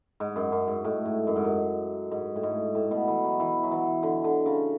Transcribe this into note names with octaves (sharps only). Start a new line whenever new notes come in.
G#2
F#2
F#2
G#2
A2
G#2
F#2
G#2
F#2
G#2
A2
G#2
A2
B2
E3
F#3
E3
F#3
E3
D3
D3
C#3